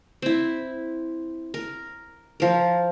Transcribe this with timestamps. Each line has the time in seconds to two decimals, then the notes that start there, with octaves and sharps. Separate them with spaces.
0.22 C4 E4
1.54 A#4
2.40 F3 A#4